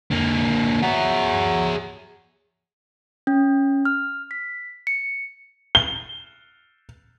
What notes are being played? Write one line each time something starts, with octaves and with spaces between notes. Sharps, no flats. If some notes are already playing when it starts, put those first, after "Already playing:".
D3 A#3
F#3 G#4 E5
C#4
F6
B6
C#7
G7